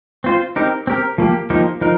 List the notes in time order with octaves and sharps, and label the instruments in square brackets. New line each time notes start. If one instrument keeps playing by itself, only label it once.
[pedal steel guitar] C4 F4 C5
C4 D#4 G4 A#4
C4 G4 A#4
F3 A#3 G4
F3 A#3 D#4 G4
F3 D#4 A#4